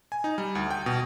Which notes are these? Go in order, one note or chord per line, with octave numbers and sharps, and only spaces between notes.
G#5
D#4
G3
D2
G5
B2